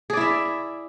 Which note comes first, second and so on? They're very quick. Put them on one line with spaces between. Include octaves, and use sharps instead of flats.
G#4 D5 E4 E5